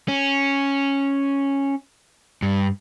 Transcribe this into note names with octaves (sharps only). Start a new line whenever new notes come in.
C#4
G2